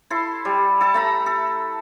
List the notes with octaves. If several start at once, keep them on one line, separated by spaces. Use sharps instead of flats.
E4 A4 C6
G3
A4 A5
A3 A#5 B5
A4